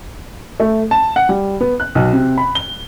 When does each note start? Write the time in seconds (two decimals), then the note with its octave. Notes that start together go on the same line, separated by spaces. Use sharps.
0.60 A3
0.91 A5
1.16 F#5
1.29 G3
1.61 B3
1.80 F#6
1.95 B1
2.13 C3
2.38 B5
2.55 G7